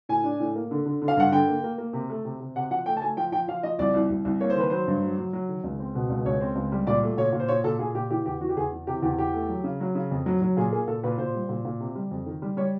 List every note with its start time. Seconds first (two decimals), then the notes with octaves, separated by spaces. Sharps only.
0.09 A2 G#5
0.24 D4
0.40 A2
0.55 A#3
0.71 D3
0.86 D3
1.02 D3
1.08 F5
1.17 G2 F#5
1.32 D3 G5
1.48 A#3
1.64 A#3
1.78 A#3
1.93 C3
2.10 A3
2.25 C3
2.40 C3
2.56 C3 F#5
2.71 F3 F#5
2.86 A3 G5
2.97 A5
3.02 A3 G#5
3.17 F3 G5
3.32 F3 G5
3.48 F3 F5
3.63 F3 D#5
3.79 C2 D5
3.94 C2
4.10 C2
4.25 C2
4.41 A#3 C#5
4.50 C5
4.56 D#3 B4
4.70 F#3 C5
4.87 G2
5.02 F#3
5.18 F#3
5.33 F#3
5.49 D#3
5.64 C#2
5.80 C4
5.95 B2
6.09 C#2
6.25 C#2 C#5
6.41 C4
6.56 C#2
6.72 G3
6.87 A#2 D5
7.03 A3
7.18 A#2 C#5
7.33 A#2
7.40 C5
7.48 A#2 C#5
7.64 A#2 A4
7.79 A#2 G#4
7.95 A#2 G4
8.11 E3 G4
8.26 E2 G4
8.41 E3 F#4
8.49 G4
8.57 E2 G#4
8.73 E3
8.87 C3 G4
9.02 E2 G4
9.18 E2 G4
9.34 A3
9.49 F#3
9.64 C#3
9.81 F#3
9.95 C#3
10.11 F2
10.26 F#3
10.42 F#3
10.57 A#2 G#4
10.72 A#3 G#4
10.87 A#2 A4
11.03 A#2 B4
11.18 A#2 C5
11.34 G3
11.49 A#2
11.65 A#2
11.80 C3
11.95 G3
12.11 F2
12.26 D#3
12.42 G3
12.57 G3 C#5